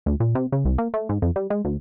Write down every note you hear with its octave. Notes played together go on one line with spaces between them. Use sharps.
D2
A#2
C3
C#3
C2
A#3
A3
G#2
F2
G3
G#3
D2